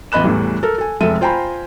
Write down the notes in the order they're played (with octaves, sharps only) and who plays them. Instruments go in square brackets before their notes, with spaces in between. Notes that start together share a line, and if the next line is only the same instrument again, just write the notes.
[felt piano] A1 E2 D#5 B5 F#6 E7
E2 A2 E3 G3
A4 A#4
A4 G#5
F1 G#3 A4 E5 D#7
F4 C5 G5 G#5 A#5 B5